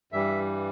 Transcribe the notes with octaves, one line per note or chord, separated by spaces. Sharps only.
G2 E3 G3 E5